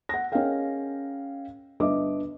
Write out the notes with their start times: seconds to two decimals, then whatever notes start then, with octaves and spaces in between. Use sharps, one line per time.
0.09 F#5 A#6
0.32 C#4 G#4 A#4 D#5 F5 G5
1.80 G1 D4 B4 D#5 E5 D6